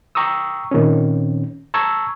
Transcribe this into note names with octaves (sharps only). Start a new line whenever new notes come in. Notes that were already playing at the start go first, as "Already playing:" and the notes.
G5 A#5 C#6 D#6 E6
A#2 D#3 C4 C#4
A5 A#5 C#6 E6 G#6